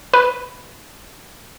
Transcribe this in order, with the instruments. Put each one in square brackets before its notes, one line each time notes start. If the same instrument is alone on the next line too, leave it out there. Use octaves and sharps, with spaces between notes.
[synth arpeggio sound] B4